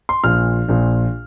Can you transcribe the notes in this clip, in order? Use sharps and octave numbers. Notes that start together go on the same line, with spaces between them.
C6
A#1 A#2 F6
A#1 A#2